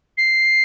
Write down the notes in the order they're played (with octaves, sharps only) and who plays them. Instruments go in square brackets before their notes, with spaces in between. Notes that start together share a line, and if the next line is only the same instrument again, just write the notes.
[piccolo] C7